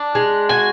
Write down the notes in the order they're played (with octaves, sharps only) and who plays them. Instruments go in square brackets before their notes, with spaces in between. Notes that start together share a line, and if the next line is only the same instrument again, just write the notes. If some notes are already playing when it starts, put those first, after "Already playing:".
Already playing: [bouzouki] D4
G#3
[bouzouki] F#4 [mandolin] G#5